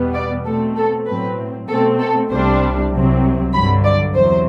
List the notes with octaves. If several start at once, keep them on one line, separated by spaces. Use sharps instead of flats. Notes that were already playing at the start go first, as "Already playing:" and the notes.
Already playing: E2 B2 G3 B3
D5
B2 A3 C4 A4
A4
A2 F#3 C4 B4
B2 A3 C4 A4
A4
C2 C3 G3 D4 C5
C2 C3 F#3 C4
G2 D3 F#3 B5
D5
E2 C3 F#3 C5